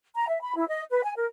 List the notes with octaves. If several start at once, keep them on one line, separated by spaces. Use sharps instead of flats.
A#5
E5
B5
E4
D#5
B4
G#5
A#4